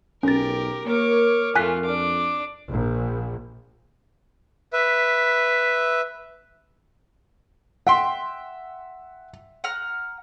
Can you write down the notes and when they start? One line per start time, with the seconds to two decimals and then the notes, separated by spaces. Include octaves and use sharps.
0.23 B1 C#4 G4 A#4 A6
0.86 A#3 A#4 C#5 D6
1.56 F2 A3 F4 G#5 F#6 B6
1.85 D4 D6
2.68 A#1
4.73 B4 E5
7.87 E5 F#5 G5 C6
9.64 F#5 A#5 F6